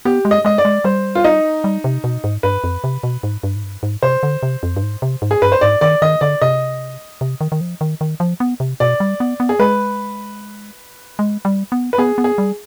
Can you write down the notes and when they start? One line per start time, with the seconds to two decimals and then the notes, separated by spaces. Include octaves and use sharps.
0.05 B3 G4
0.25 G#3
0.31 D#5
0.45 G#3 D#5
0.58 D5
0.65 G#3
0.84 G3 C5
1.15 F4
1.24 D#4
1.64 G3
1.84 C3
2.04 B2
2.24 G#2
2.43 G2 B4
2.64 F2
2.84 C3
3.03 B2
3.23 G#2
3.43 G2
3.56 G#2
3.63 G2
3.83 G#2
4.02 C3 C5
4.23 D3
4.43 C3
4.63 F2
4.76 G2
4.83 G#2
5.02 C3
5.22 G#2
5.31 G#4
5.42 G2 B4
5.52 C5
5.61 G#2 D5
5.81 D#3 D5
6.02 D#3 D#5
6.21 D3 D5
6.42 C3 D#5
7.21 C3
7.41 D#3
7.52 D#3
7.61 F3
7.81 D#3
8.01 D#3
8.20 F3
8.40 B3
8.60 C3
8.80 B2 D5
9.00 G3
9.20 B3
9.40 B3
9.49 G#4
9.59 G#3 B4
11.19 G#3
11.45 G3
11.72 B3
11.93 B4
11.98 B3 G#4
12.18 B3
12.24 G#4
12.38 G3